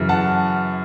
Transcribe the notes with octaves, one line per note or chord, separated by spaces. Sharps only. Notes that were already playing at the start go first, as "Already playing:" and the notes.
Already playing: F#2 C#3 E3
F#5 A5